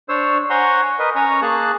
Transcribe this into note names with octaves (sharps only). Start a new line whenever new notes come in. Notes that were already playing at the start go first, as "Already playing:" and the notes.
D4 C5 C#5 E6
C5 C#5 F#5 G#5 A#5 C6
A#4 B4 D#5
C#4 C#5 G#5 A#5
A#3 G#4 A5 F#6